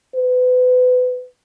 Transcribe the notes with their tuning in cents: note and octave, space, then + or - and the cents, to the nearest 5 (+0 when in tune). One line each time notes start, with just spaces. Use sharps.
B4 +30